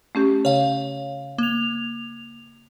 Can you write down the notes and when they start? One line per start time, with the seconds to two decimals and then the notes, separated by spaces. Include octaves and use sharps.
0.15 A3 C#4 G4
0.45 C#3 C#5 F5
1.38 A#3 F7